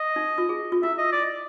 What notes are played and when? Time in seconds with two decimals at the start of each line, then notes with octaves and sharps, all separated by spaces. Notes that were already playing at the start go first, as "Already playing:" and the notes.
Already playing: D#5
0.16 D#4
0.38 F4
0.49 G#4
0.72 F4
0.83 E4 E5
0.98 D#5
1.12 D5